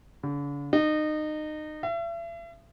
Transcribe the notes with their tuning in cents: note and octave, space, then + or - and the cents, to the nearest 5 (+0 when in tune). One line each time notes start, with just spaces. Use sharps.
D3 -45
D#4 -25
E5 +40